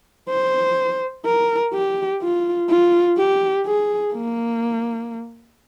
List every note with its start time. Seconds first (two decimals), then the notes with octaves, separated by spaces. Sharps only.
0.29 C5
1.25 A#4
1.74 G4
2.22 F4
2.69 F4
3.18 G4
3.66 G#4
4.13 A#3